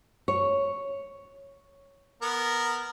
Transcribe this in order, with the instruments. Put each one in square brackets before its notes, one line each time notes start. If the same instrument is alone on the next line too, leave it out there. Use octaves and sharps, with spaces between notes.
[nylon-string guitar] C#5
[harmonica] B3 A#4